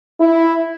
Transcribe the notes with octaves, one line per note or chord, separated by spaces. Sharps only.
E4